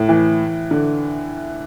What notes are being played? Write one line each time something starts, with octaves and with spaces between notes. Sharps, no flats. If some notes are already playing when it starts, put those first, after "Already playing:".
Already playing: A2
E3
D3